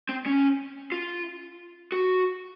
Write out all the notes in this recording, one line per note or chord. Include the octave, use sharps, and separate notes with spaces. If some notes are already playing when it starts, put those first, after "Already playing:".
C4
C#4
F4
F#4